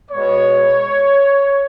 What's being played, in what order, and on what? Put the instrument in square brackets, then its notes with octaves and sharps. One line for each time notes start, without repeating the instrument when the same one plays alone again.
[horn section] B2 G#3 B3 C#5